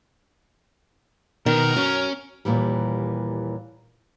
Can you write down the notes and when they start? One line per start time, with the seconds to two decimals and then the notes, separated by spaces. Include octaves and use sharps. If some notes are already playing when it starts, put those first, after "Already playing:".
1.46 B2 D#3 B3 A#4
1.76 F#2 C#4
2.45 D#2 A#2 E3 G3